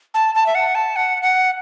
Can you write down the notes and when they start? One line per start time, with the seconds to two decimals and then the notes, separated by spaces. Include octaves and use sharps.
0.14 A5
0.35 A5
0.46 E5
0.55 F#5
0.75 A5
0.96 F#5
1.22 F#5